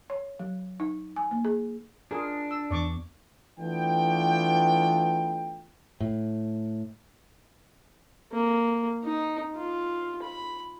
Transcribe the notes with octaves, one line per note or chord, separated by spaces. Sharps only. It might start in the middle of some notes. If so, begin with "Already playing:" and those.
C#5
F#3
D#4
G#5
A#3
G#4
D4 F4 G#4 A#4
E6
E2 B3 D5 C#6 D6
E3 A3 B3 D4 F4 G5
A2
A#3
D#4
F4
B5